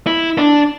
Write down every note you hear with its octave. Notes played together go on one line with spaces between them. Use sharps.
E4
D4